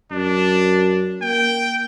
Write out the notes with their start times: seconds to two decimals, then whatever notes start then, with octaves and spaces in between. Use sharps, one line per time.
0.11 F#2 D4
1.22 A#3 G5